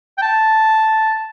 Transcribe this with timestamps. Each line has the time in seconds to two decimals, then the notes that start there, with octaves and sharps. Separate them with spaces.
0.18 G5
0.22 A5